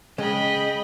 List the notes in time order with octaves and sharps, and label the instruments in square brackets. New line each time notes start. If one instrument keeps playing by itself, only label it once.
[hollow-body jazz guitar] C#3 G#3 [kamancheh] D#5 B5 [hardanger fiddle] G5